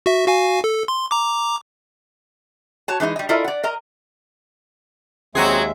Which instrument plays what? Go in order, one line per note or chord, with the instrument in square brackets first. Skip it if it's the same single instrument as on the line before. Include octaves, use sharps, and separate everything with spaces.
[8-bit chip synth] F#4 E5
F#4 F5 G#5
A4
C6
A#5 D6
[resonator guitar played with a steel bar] F#4 C#5 A5
E3 G#3 D#4 D#5
G3 D#5
E4 F4 A4 A#4 D5 D#5
D5 F#5
A#4 D#5 A#5
[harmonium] D#2 G#3 E5 [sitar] F#3 F#4 G#4 [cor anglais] C4